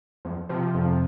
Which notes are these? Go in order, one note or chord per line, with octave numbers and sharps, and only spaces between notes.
F2
C3 F3
F2